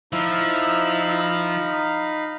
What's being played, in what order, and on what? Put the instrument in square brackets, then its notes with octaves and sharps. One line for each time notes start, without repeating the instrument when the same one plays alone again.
[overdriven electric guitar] F3 [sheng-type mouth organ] D#4 F5 B5 [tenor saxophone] E4